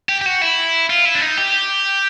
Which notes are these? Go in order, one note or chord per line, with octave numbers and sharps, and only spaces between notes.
G4
G4
F#4
E4
F4
E4
D4
D#4
G4